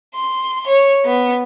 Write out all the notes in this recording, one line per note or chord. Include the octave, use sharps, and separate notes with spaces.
C6
C#5
B3